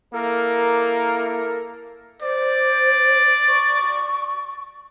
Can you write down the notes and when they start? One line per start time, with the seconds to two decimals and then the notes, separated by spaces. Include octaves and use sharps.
0.13 A#3 E4 A4 A#4
2.22 C5 D5
3.48 C#6